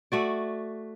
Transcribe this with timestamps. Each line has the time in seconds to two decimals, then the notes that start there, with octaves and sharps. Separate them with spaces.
0.12 A3 F#4 D5